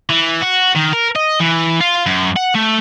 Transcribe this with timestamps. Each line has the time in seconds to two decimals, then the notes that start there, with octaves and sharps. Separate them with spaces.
0.10 E3
0.42 F#4
0.76 D#3
0.93 A#4
1.16 D#5
1.40 E3
1.81 F4
2.07 F#2
2.36 F#5
2.55 A3